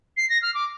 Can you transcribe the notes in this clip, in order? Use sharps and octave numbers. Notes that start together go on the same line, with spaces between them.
C7
A#6
F6
D6